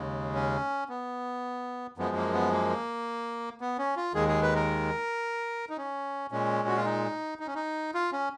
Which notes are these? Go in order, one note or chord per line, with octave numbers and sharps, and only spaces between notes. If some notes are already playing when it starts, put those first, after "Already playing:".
Already playing: D#2 C#3 G#3
C#4
B3
F#2 F3 G#3 B3
A#3
B3
A#3
B3
C#4
F4
D#2 D#3 G#3 G#4
G#4
B4
A#4
D#4
C#4
A#2 G#3 C#4
F#4
F4
D#4
D#4
C#4
D#4
F4
C#4